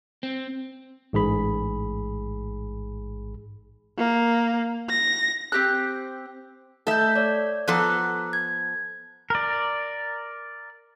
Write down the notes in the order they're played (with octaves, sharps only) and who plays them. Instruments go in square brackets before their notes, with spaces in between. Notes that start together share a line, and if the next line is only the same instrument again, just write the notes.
[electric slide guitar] C4
[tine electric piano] A1 G#2 G#4 B5
[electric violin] A#3
A#6
[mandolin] C4 G4 F#6
[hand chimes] A3 G6 [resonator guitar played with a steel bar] A4 E5
[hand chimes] C#5 D5
[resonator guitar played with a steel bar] F3 B3 A4 [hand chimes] A#5 D6 F#6
[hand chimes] G#6
[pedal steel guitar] A#4 D5